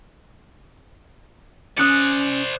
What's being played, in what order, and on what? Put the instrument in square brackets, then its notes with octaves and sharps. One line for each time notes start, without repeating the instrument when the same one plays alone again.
[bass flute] C#4 [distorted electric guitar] C5 D5 [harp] D#6 F#6 C#7